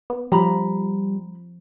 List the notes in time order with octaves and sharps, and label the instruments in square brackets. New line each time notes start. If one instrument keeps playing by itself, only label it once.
[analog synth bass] B3
[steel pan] F3 [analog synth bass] G3 [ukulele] A#5 B5